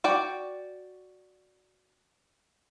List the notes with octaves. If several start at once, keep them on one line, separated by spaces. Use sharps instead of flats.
F#4 D5 G5